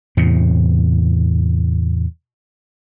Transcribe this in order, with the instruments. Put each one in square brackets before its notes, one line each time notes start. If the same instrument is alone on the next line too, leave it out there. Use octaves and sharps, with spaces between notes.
[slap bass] E2 A2 C3